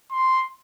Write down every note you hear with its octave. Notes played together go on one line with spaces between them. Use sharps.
C6